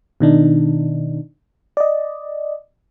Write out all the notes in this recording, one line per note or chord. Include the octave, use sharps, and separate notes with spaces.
B2 D#3 D4 D#4
D5 D#5